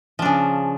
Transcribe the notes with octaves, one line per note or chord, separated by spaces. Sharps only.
C#3 F3 D4